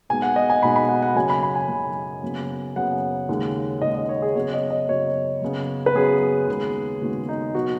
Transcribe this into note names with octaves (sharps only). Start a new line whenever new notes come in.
B1 B2 G#3 B3 G#5
F#5
D#5
G#5
B1 B2 G#3 B3 B5
B5
F#5
F#5
F#2 C#3 F#3 G#5
B5
B5
G#5
F#2 C#3 F#3
F#1 F#2 C#3 B3
F#1 F#2 C#3 B3 F#5
D#2 C#3 G#3
D#2 C#3 G#3 D#5
D#5
C#5
G#4
F#2 C#3 F#3 B3 C#5
D#5
D#5
F#2 C#3 F#3 B3 C#5
F#2 C#3 B3
B4
F#2 C#3 B3 G#4
D#2 C#3 G#3 B3
D#2 C#3 G#3 B3 F#4
D#4
B2 F#3 B3 F#4